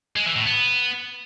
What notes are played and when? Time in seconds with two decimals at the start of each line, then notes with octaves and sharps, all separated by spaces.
0.16 G#3
0.26 E3
0.36 A2
0.46 B3